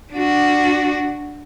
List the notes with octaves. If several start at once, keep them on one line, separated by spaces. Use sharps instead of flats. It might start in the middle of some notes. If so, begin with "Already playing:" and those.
D4 F#4